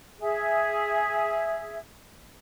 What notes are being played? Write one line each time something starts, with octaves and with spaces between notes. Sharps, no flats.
G#4 E5